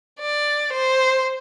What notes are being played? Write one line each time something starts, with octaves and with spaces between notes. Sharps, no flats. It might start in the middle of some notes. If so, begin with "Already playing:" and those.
D5
C5